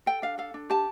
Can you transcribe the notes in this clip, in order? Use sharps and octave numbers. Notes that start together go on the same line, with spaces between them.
A4 G5
D4 F5
A4 F5
D4
G4 A5